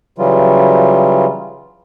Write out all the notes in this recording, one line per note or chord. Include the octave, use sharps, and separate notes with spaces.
C#3 E3 F#3 G3 F4